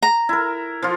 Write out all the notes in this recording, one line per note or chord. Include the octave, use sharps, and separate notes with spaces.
A#5
E4 A#4
F3 F4